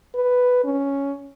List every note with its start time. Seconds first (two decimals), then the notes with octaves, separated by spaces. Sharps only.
0.15 B4
0.64 C#4